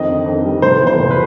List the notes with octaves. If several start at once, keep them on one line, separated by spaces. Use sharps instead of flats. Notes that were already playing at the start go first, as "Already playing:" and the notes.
Already playing: F2 D#3 D#5
D3
F2
G3
F1 C5
E2
C5
F1
B4